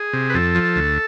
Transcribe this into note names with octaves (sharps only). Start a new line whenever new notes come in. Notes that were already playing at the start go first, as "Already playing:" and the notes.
Already playing: G#4
C3
B4
F2 A4
F3
D2